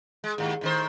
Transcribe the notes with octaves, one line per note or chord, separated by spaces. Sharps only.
G#3
D#2 G#2
A2 D#3 C5